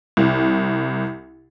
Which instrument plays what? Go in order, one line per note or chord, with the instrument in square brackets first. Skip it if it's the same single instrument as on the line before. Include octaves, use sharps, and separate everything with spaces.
[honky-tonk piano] C2